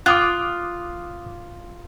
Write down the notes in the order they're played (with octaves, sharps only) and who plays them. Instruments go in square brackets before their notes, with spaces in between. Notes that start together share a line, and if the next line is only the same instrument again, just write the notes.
[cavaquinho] F4 [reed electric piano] D6 D#6 F#6